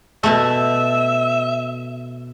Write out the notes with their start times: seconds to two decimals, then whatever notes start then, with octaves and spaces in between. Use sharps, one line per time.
0.23 B2 A3 E5